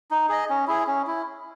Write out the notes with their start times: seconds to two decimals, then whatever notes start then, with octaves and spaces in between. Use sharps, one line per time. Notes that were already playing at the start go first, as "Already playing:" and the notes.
0.11 D#4
0.29 G#4 D#5
0.50 C#4
0.68 E4 G#4
0.87 C#4
1.07 E4